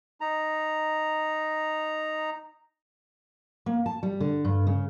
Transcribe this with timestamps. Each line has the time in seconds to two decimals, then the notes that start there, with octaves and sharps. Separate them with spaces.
0.21 D#4 A#5
3.66 A#3
3.86 A5
4.03 G3
4.20 D3
4.45 G2
4.67 C#3